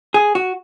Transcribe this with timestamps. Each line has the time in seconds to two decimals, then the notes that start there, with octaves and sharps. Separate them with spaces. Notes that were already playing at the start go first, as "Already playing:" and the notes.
0.14 G#4
0.35 F#4